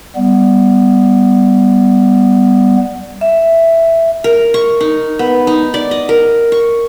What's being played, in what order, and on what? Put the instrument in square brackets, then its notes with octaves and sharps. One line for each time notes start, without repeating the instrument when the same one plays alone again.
[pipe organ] G3 B3
[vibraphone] E5
[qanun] A#4
C#6
D#4
B3
D#4
D5
D#5
A#4
C#6